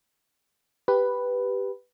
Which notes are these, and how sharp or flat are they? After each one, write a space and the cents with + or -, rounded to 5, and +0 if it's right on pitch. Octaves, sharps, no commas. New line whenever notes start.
G4 +0 B4 +0